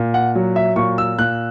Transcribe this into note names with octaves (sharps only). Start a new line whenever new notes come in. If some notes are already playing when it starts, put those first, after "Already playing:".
Already playing: A#2
F#5
F#3
E5
A#2 C#6
E6
A#2 F#6